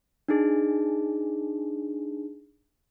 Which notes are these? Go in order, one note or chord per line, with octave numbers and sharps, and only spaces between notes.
D4 D#4 G#4